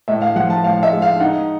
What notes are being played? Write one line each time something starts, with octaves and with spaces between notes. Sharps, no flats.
A2 E5
F5
F3 F#5
A5
A2 F5
E5
G#3
F5
D#4 F#5